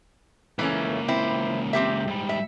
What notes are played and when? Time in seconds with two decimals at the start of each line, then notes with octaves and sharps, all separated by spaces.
0.59 C#2 E3 A3 A#3 C#4
1.08 C4 E4
1.73 C4 G4 E5
2.07 G#2 G3
2.29 E5